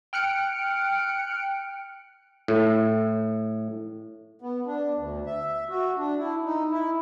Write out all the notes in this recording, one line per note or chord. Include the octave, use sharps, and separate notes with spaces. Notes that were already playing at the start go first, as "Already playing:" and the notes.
G5 F6 F#6 C#7 D7
A2
B3
D4
D2
E5
F#4
D4
E4
D#4
E4